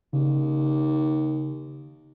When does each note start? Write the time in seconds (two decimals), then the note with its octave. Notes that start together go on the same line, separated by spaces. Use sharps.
0.13 D#2 C#3